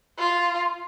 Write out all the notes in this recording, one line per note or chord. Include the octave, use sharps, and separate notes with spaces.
F4